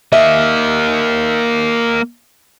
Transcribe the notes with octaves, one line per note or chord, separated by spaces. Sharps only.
A#3 D#5 E5